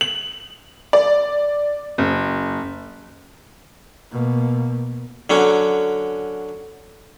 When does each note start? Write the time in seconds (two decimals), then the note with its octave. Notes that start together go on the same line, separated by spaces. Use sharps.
0.01 F#7
0.93 D5
1.98 F#1
4.11 B2 A#3
5.30 D3 F#3 C#4